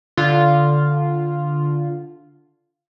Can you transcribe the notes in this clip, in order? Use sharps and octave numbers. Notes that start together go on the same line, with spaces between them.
D3 F4